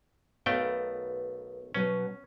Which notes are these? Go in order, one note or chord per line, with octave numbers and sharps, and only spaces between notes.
B1 A3 B3 A#4 F5 G5
B2 F#3 C#4 B4